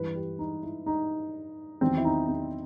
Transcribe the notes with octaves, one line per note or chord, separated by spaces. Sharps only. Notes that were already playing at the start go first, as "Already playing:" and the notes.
Already playing: G2 E3 B4
G4
D#4
E4
D#4
E2 D#3 F#3 C4
E4
D#4
C4